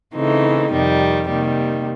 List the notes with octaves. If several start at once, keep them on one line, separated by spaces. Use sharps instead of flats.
C#3 E3 A3 C4 D#4
F2 C3 D#3 G3
C3 D#3 G3 A#3